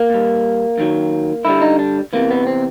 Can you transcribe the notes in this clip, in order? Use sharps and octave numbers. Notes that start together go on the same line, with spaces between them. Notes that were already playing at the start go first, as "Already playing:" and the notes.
Already playing: A#3
A#2 G3
F#2 D#3 F#3
G2 D3 G3 E4
D#4
D4
E2 C3 E3 A#3
B3
C4